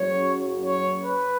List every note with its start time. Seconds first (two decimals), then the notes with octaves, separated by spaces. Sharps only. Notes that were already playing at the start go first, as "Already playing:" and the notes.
Already playing: F#1 F#2 C#3 F#3 C#5
0.62 C#5
1.04 B4